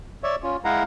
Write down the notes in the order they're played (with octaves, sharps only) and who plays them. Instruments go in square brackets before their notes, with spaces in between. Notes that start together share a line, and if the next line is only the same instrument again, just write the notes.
[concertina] C#5 D5 E5
C#4 F4
G#3 E4 F5 F#5 A#5